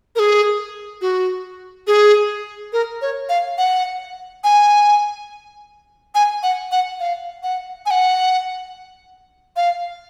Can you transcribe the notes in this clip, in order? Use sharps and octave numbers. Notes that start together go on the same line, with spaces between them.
A#4
G#4
F#4
G#4
A#4
C#5
F5
F#5
G#5
G#5
F#5
F#5
F5
F#5
G#5
F#5
F5